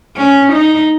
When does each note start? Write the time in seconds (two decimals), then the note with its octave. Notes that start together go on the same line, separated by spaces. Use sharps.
0.17 C#4
0.52 D#4